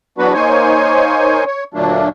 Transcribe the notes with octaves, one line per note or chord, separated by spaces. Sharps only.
E2 F#3 B3 D4 F#4 B4
A#3 D#4 C5 C#5 G#5
C#5
D2 A#2 F#3 A3 A#3 D4